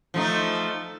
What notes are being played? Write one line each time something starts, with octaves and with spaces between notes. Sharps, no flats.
F3 A3 D#4